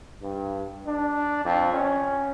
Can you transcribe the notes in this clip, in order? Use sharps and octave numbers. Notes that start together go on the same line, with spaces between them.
G2
D4
F2
C#4